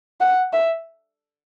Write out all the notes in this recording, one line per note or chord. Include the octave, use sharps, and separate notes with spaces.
F#5
E5